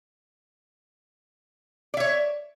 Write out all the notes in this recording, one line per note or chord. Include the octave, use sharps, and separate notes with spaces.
C#5 D5 E5